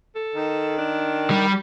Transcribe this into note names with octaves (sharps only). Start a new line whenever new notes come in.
A4
D#3
D4
G3